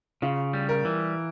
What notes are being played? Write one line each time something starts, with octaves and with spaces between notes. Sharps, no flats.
C#3 F4
G3
A#4
E3